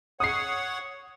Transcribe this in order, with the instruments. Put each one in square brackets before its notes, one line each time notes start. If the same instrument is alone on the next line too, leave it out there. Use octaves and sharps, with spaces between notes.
[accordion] C#5 F#5 [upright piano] D#6 C7